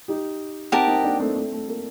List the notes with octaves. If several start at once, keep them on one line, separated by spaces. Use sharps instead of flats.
D#4 G4
C4 D#4 G4 A#4 F#5 A5
C4 D#4
A#3 D4
A3 C4
A3 C4
A3
A#3